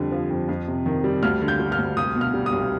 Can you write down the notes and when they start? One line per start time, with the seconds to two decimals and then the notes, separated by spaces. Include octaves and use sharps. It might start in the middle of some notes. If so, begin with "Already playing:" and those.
Already playing: F2 D3 G3
0.12 F3
0.30 F2
0.49 F2
0.68 C3
0.86 D#3
1.04 G3
1.23 D2 F6
1.42 D3
1.48 G6
1.60 G3
1.72 F6
1.78 D2
1.97 C2 D#6
2.15 B2
2.21 F6
2.34 G3
2.46 D#6
2.53 C2